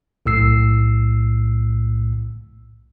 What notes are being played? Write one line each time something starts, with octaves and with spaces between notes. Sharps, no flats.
B1 A2 E6 C7